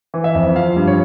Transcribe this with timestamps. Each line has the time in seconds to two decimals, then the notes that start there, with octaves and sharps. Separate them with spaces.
0.14 E3
0.24 E5
0.35 F2
0.56 F3 F5
0.76 G2
0.88 C#5